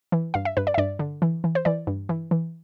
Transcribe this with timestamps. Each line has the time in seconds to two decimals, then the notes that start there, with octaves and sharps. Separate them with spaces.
0.12 E3
0.34 G2 F5
0.45 E5
0.57 G2 B4
0.67 D5
0.74 E5
0.78 G2 D5
0.99 D3
1.22 E3
1.44 E3
1.55 C5
1.65 E3 D5
1.87 G2
2.09 E3
2.31 E3